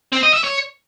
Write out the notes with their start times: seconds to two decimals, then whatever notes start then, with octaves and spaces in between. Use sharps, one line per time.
0.13 C4
0.23 D#5
0.33 E5
0.44 C#5